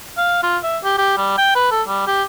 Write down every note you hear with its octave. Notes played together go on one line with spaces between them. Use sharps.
F5
F4
E5
G4
G4
G3
G5
B4
A4
G3
G4